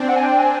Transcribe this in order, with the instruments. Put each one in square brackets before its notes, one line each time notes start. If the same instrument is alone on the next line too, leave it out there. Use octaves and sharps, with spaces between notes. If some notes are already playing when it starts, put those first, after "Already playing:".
Already playing: [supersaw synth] C4 D4
[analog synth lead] F#5
G#5
G5
G#5